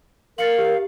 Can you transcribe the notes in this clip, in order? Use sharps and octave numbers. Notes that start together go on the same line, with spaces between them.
A#4 F5 A6 C#7 F#7
G4